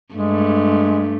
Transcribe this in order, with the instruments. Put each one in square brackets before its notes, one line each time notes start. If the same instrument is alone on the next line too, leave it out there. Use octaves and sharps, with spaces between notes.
[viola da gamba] G2 A3 [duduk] G#3